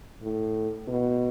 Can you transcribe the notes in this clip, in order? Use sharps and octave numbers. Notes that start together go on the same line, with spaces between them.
A2
B2